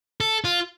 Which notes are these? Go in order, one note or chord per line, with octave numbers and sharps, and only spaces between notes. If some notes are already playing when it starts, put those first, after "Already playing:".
A4
F4